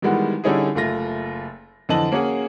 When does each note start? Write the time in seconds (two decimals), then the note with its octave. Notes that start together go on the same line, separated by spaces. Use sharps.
0.02 D#3 E3 G3 G#3 B3 F#4
0.44 D3 G3 C#4 D#4 E4 G#4
0.75 F#1 A3 F4 A#6
1.89 F2 D3 E3 D#5 A5 F#7
2.12 A#3 C#4 F#4 G#4 F#5